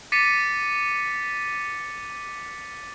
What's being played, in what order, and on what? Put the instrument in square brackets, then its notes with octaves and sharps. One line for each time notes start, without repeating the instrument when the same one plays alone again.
[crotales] D6 A6 B6 C#7 D#7